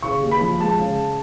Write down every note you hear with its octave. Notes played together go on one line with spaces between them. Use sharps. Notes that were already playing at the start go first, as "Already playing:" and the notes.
C#3 C#6
D#2
B5
F3
G#3 A5
C#3